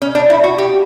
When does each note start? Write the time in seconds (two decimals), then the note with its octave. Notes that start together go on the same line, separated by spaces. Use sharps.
0.02 C#4
0.15 D4
0.30 E4
0.43 F#4
0.58 G4